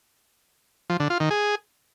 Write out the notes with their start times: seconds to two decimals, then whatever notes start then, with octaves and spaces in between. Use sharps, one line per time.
0.90 F3
1.00 D3
1.10 F4
1.20 D#3
1.31 G#4